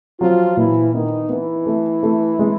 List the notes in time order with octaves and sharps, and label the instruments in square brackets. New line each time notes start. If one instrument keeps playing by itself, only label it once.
[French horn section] F3 F4 [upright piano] F#3
[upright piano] A#2 [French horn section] E3 E4
[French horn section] D#3 D#4 [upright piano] B3
[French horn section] E3 E4 [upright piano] B3
[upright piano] A3
A3
G#3